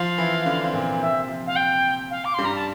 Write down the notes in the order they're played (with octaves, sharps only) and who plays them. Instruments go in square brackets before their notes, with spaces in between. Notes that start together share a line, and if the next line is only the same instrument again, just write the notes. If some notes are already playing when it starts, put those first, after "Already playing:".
Already playing: [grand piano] F3 F4 [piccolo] F5
[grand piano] E3 E4
D3 D4
C4
A#2 A#3
[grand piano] C3 C4 [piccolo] E5
[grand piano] F3
[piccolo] F5
G5
F5
D6
[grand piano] G2 G3 [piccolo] C6
[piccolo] A#5
A5